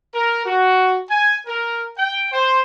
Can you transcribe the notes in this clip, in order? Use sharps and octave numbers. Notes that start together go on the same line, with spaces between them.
A#4
F#4
G#5
A#4
G5
C5